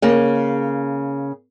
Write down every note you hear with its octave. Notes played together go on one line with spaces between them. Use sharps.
C#3 A#3